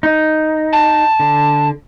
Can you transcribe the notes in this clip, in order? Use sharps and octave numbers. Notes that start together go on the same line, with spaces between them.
D#4
A5
D3